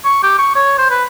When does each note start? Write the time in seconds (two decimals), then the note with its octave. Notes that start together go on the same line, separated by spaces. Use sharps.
0.05 C#6
0.23 G4
0.39 C#6
0.55 C#5
0.78 C5
0.90 B4